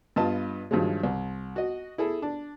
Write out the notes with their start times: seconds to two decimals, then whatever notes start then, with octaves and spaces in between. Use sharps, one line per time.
0.16 G2 B3 F4 D#5 A5
0.71 G2 D#3 F3 F#3 G#3
1.03 C2
1.56 F#4 D#5
1.98 E4 G#4 A4
2.22 D4